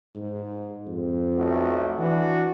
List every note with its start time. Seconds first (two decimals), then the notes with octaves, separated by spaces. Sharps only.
0.15 G#2
0.87 F2
1.37 B1 A3 F#4
1.99 E3 D4 F#4